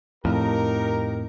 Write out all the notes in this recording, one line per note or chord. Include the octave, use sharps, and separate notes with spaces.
F2 A2 D#4 G4 A#4